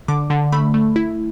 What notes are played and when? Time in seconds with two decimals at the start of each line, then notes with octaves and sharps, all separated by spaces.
0.08 D3 D6
0.30 D3
0.52 A3 B5
0.74 A3
0.96 E4